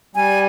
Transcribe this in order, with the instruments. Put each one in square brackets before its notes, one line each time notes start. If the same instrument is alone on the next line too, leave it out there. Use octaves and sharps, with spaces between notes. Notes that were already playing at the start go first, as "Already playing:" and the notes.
[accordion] G3 [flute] G#5